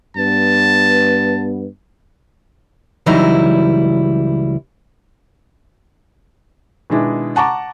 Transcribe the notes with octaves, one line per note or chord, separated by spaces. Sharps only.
G2 B3 A5
C#2 E3 F#3 G3 D#4 E4
B2 D#3 G#3 D4 E4
F#5 A5 A#5 C#6 D6